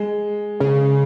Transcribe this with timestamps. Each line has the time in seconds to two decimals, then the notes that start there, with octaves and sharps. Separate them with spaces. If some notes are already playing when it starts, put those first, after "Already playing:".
Already playing: G#3
0.60 C#3